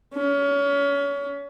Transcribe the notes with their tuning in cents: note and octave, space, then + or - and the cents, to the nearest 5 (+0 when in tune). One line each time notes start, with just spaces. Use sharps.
C#4 +30